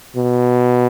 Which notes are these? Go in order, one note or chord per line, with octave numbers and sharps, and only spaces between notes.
B2